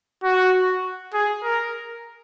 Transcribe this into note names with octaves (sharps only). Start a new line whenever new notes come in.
F#4
G#4
A#4